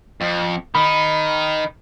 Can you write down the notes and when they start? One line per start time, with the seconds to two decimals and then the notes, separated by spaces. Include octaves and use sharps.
0.21 F2
0.75 D#3 D#4 B5